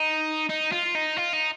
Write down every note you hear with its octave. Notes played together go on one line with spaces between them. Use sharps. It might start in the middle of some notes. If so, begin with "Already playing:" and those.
Already playing: D#4
D#4
F4
D#4
F4
D#4